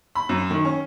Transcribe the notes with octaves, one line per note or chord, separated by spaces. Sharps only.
B5
F#2
D#3
C#4